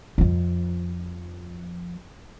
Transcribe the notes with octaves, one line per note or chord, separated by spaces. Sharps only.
F2 F3